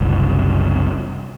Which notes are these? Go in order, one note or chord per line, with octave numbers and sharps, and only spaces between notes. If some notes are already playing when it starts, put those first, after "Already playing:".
F#1 C2